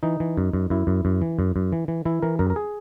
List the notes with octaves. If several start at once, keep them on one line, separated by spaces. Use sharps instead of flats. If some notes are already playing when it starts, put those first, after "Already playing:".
E3 D#4
E3
F#2
F#2
F#2 E4
F#2
F#2
E3
F#2
F#2
E3
E3
E3 E4
E3 A#4
F#2 A#4
A#4
G#4